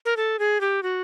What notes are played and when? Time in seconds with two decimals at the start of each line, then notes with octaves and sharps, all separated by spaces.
0.05 A#4
0.17 A4
0.39 G#4
0.61 G4
0.83 F#4